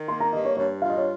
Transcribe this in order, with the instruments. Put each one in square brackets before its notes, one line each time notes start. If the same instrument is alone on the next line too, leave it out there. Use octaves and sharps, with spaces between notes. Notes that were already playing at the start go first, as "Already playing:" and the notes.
Already playing: [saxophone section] D#3
[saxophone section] A#3 [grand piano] C6
[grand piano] A#5
[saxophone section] G2 [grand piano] D#5
[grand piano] C#5
[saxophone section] G2 [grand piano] C#5
[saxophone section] F4 [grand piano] F5
[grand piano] D#5
C#5